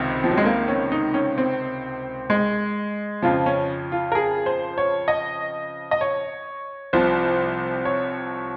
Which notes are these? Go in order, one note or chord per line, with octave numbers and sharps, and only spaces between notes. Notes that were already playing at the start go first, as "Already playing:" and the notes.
Already playing: C#2 C3 D#3 C4
F3
F#3
G#3
A#3
C#4
D#4
C#4
C4
G#3
F2 C#3 F3 F4
C#4
F4
A#4
G#4
C5
C#5
D#5
D#5
C#5
C2 C3 F3 C5
C#5